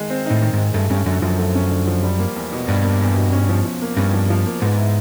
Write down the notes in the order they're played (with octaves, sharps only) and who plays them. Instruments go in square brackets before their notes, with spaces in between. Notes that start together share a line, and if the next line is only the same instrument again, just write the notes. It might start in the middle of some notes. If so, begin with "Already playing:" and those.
Already playing: [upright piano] D#3 G#3
C4
[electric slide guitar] A2 [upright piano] D#4
[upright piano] D#3
[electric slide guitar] G#2 [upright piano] G#3
[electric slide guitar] G2 [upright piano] A3
[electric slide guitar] G2 [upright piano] C#4
[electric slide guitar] F#2 [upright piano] D3
[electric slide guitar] F#2 [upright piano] F3
[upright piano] A3
C#4
D3
F3
G3
A#3
E2
B2
[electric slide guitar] G2 [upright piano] G3
[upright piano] A#3
E2
B2
C#4
F3
F3
A#3
[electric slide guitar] G2 [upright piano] C#4
[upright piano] F3
F3
A#3
[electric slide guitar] G#2 [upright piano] B3
[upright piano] E4